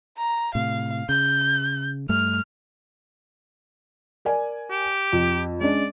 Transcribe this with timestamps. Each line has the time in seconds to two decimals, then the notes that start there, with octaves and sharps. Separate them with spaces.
0.17 A#5
0.55 A2 C3 F5
1.09 C#3 G6
2.09 G2 A3 F6
4.25 A#4 D5 G#5
4.70 G4
5.13 F2
5.61 G#3 C#4 D4 D5